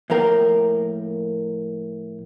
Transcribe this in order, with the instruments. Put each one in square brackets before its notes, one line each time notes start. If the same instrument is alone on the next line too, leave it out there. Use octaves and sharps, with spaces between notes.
[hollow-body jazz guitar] A2 F3 A#3 A#4 G5